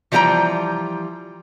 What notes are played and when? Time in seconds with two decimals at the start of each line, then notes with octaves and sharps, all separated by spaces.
0.12 E3 F3 G3 G4 G5 A#5